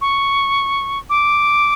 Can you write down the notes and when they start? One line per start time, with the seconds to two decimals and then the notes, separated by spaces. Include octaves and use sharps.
0.01 C#6
1.10 D6